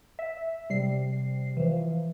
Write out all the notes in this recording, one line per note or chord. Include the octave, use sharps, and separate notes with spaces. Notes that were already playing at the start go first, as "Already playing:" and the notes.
E5
C3 G3 C7
E3 F3